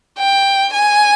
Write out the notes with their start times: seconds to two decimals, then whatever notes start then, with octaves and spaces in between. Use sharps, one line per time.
0.19 G5
0.73 G#5